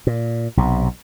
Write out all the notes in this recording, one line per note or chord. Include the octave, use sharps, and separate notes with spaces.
A#2
B1 C3